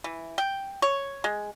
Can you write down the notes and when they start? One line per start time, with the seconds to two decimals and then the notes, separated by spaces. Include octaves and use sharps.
0.04 E3
0.38 G5
0.82 C#5
1.24 G#3